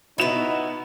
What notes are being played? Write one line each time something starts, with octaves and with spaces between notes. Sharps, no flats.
B2 B3 D#4 E4 F#4 E7